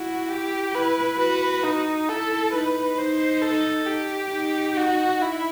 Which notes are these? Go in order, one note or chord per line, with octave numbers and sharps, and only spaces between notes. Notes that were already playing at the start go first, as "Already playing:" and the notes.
Already playing: E4 F#4
G4
E4 B4
F#4 B4
D#4
E4 A4
D#4 B4
D#4 C5
A4
G4
D#4
F#4
E4